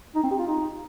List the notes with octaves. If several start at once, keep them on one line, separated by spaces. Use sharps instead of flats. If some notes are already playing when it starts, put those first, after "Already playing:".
D#4
C4
G4
F4
D#4